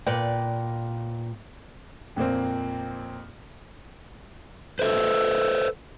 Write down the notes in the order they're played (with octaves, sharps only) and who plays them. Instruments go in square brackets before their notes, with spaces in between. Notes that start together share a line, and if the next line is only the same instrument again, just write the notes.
[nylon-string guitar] A#2 B4 D5 G5
[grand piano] F2 A#2 A#3 C4
[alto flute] A4 [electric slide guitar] B4 C5 E5